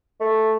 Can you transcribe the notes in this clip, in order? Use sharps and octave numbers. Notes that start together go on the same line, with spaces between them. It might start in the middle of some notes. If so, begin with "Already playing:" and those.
A3